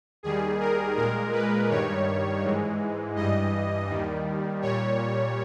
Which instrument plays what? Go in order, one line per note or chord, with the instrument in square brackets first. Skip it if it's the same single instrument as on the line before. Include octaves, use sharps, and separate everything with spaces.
[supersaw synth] D#2 D#3 G3 G#4
A#4
A#2 G#3 A#4
B4
G2 D#3 G3 C#5
G#2 E3 G#3
G2 E3 G3 D#5
D#2 D#3 G3
A#2 G3 C#5